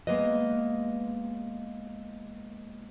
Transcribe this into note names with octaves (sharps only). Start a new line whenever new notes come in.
G#3 A#3 B3 B4 D#5